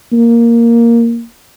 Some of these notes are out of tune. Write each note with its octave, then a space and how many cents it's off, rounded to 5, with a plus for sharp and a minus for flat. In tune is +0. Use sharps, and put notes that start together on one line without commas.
A#3 +0